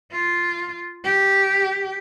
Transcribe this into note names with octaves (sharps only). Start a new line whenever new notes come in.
F4
G4